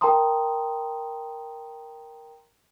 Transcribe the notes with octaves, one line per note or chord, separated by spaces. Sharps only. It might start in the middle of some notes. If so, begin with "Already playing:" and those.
A#4 G5 A5 A#5 C6 D#6